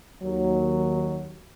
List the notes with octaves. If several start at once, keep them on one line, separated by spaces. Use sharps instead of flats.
D#2 F#3